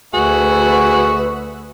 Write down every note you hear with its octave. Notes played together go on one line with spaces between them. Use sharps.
D2 F#4 G#4 B4 E5